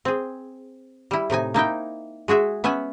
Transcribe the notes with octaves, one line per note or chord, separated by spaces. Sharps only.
C4 G#4
G3 E4
A2 C3 D#4 G#5
A#3 D#4 E4 G5
G#3 F#4 G#4 E5
B3 C#4 E5 F#5 G#5